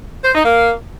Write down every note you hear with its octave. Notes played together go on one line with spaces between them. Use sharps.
C5
D#4
A#3